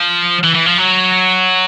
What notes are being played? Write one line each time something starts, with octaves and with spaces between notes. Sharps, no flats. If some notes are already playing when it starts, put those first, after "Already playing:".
Already playing: F3
E3
E3
F3
F#3